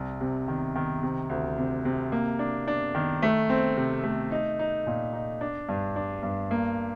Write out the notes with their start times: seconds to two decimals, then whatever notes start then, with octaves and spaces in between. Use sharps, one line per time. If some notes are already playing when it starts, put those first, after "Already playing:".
Already playing: C2
0.21 C3
0.48 D#3
0.76 D#3
1.03 C3
1.29 D2
1.58 C3
1.85 C3
2.12 A#3
2.39 D4
2.68 D4
2.95 D#3
3.22 A3
3.49 C4
3.77 C3
4.03 A3
4.31 D#4
4.59 D#4
4.87 A#2
5.13 D#4
5.41 D4
5.69 G2
5.96 D4
6.23 G2
6.51 A#3